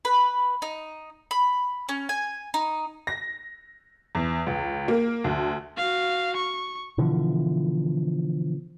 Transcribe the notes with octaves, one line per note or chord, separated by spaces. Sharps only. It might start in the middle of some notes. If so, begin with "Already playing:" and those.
B4
D#4
B5
C#4
G#5
D#4
A#6
E2
C#2
A#3
D2
F#4 F5
C#6
B2 D3 E3 F3